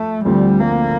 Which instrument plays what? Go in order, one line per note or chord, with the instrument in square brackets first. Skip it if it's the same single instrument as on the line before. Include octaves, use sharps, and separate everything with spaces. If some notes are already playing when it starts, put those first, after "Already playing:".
Already playing: [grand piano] F3 F4 [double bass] A3
[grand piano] D2 D3 F3 C4 [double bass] G3
[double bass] A#3